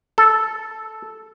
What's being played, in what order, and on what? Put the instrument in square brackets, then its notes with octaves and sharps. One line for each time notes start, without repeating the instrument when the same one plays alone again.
[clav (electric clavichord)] A4